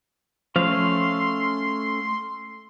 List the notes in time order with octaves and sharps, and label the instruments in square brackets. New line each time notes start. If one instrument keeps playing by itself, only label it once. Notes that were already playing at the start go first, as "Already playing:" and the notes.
[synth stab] F3 [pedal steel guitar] A3 C#4 F5 [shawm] C6